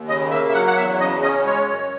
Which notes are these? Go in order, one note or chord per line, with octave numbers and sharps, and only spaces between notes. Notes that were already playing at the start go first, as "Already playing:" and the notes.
Already playing: D#2
C#3 D#5
A#3 E5
E5
F#3 F#5
F#5
E2 E5
C#3 D#5
C#4 D#5
G#3 C#5
F#2